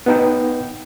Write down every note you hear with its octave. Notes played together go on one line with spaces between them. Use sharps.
B3 D#4 G5